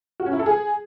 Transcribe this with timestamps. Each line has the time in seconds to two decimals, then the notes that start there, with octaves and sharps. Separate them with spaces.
0.20 F#4
0.26 C#4
0.33 E4
0.39 A4
0.46 G#4